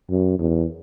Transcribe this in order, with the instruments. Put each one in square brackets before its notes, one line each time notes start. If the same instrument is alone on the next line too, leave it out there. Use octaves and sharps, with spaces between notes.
[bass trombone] F#2
E2